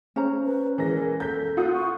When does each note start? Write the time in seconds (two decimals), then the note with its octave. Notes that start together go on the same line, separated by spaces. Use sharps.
0.16 C#4 C5 A#5
0.46 B4
0.78 E3 G#3 A#4 A#6
1.20 A4 G6 B6
1.57 F4 F#5 D#6
1.74 C#6